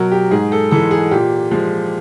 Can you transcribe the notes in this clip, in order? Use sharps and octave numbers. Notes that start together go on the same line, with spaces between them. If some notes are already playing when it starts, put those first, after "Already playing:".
Already playing: B2 F#3 A#4
G4
G#2 G#4
A4
E3 G#3 A4
G#4
A#2 G4
F3 G#3